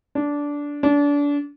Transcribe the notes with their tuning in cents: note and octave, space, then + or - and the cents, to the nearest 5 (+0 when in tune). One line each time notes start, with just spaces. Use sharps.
D4 -15
D4 -30